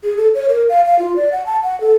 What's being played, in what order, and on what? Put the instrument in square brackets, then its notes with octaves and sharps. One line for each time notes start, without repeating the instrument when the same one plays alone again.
[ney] G#4
A4
C#5
A#4
F5
F5
F4
D5
F#5
A5
F#5
A4